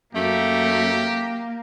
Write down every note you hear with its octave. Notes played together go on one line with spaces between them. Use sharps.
F#2 A3 A#3 G4